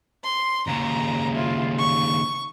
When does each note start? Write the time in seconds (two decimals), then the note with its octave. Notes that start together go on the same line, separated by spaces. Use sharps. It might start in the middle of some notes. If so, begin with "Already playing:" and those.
0.24 C6
0.67 D#2 C#3 A#5
1.33 E4 F4
1.79 C#6